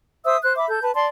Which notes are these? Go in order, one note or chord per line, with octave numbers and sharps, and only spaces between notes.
C5 E5 D#6 E6
C5 F#6
E5 B5 D6
A4 G6
B4 A5
D5 A5 C6